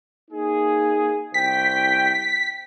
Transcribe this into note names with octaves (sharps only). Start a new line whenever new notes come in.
A#3 D#4 G#4
C2 G5 B6